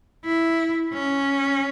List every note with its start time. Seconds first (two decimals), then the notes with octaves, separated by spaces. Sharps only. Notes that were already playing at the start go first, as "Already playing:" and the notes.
0.25 E4
0.93 C#4